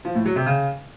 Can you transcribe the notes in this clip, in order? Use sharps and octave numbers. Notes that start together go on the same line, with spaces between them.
F3
A2
F#3
C3
C#3